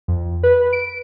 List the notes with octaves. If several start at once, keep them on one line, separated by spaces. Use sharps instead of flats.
F2
B4
D7